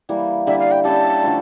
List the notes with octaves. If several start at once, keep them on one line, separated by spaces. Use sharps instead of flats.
E3 G3 A#3 E4
D3 G3 A#3 E4 E5
F5
G5
G3 C#4 G4 A5
D3 F3 A3